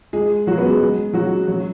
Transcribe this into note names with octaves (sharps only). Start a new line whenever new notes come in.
G#3 G#4
F#3 F#4
B3
G#3 G#4
G#3 G#4
F#3 F#4
F#3 F#4